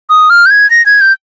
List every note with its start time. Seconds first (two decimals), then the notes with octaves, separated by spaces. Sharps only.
0.10 D#6
0.30 F6
0.46 G6
0.51 G#6
0.70 A#6
0.86 G#6
1.01 G6